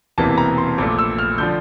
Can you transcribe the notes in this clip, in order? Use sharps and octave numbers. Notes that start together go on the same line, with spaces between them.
E1 E2 C3 E3 A#3 A5
A#5
C6
A#1 A#2 A3 D6
E6
F6
D3 F3 G6